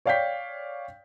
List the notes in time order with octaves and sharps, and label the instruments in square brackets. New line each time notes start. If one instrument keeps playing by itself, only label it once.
[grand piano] C#5 D5 F5 G5 G6 B6